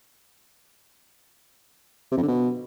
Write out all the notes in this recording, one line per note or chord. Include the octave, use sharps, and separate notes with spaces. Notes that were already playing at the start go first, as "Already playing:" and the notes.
C3
F2
D3
B2